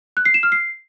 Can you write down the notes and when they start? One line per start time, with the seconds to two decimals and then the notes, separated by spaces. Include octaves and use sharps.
0.17 F#6
0.25 C7
0.34 E7
0.43 F6
0.52 C7